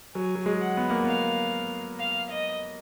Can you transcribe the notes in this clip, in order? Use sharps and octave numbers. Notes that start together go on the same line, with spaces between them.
F#3 G#5
F#3
G#3
F#5
B3
A#3
B3 F5
F5
D#5